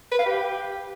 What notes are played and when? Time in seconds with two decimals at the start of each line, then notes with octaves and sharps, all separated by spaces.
0.12 B4
0.19 F5
0.26 G4